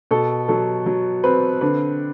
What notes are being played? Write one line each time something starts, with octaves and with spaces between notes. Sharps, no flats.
B2 A4
F#3 A4
F#3
C4 B4
D3 B4